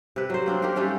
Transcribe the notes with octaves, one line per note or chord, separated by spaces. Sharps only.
C3 B4
F#3 C5
A#3 C4 D4
A#3 D#4 G4 A#4
G3 A3 C#4 D4